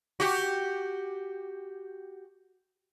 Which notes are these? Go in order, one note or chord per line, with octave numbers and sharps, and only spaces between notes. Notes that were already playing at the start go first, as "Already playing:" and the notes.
F#4 G4